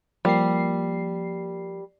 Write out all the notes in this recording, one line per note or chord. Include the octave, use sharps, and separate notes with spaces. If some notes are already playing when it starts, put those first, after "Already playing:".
F3 G3 A#3 C7